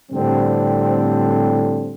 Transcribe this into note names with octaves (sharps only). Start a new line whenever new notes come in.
A2 D3 G3 C4